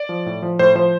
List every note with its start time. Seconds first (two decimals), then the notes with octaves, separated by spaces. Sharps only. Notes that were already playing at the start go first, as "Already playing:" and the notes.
Already playing: D5
0.09 F3
0.26 A2
0.42 F3
0.59 A2 C5
0.75 F3 C5